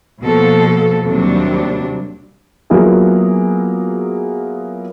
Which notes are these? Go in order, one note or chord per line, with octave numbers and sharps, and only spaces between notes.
B2 F3 A#3 A4
D#2 C3 F#3 G3 D4
F#3 A#3 B3 E4 F4 G#4